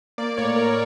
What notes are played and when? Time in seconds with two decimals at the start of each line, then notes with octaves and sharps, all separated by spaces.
0.18 A#3 D5
0.37 A2 C#5
0.55 A#3 A#4